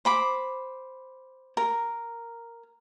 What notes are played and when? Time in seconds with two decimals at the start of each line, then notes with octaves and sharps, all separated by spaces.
0.05 C5 B5 D6
1.57 A#4